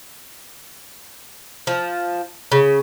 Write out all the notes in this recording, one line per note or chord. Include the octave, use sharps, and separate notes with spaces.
F3
C#3